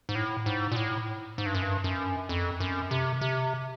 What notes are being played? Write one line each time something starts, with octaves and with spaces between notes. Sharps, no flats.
G#2
A2
G#2
A#2
A2
G#2
G2
F#2
G2
F#2
F2
F#2
C3
C3